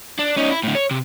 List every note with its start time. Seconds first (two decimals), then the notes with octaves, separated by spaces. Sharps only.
0.19 D4
0.37 C#4 D#4
0.51 E4
0.64 A2 D3
0.75 C#5
0.91 C3